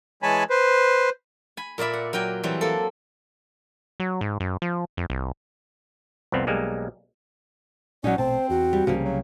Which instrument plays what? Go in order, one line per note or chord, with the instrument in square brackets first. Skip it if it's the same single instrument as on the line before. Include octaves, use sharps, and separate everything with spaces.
[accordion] E3 G#3 C#5 G#5 A5 B5
B4 C5
[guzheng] G#5 B5
A#2 A#4 D5 E5 B5
F#5
F#3 A#4 G5 G#5
E3 F#3 G3 C4
A#3 A4
[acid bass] F#3
G#2
F#2
F3
F2
C2
[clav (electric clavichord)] C2 F2 B3 C4
B1 G3 G#3 A#3
[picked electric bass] A#1 A#2 [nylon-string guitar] F#3 D#4 [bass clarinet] C#4 [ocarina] D5
[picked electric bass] A#1 B2 A3 [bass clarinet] C4 [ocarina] C5 [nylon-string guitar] A5
[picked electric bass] E2 [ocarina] F#4
[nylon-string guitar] G3
[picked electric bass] C2 [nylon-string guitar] C#3 G3 A#3 [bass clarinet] F3
[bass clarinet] F#3